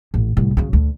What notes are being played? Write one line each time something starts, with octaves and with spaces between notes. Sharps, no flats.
A1
C2 A2
C#3 F#3
D2